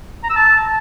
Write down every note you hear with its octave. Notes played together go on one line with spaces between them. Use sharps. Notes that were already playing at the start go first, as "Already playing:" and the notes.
A#5
E6
A5